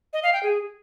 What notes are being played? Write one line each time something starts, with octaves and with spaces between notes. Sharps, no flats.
D#5
F5
G5
G#4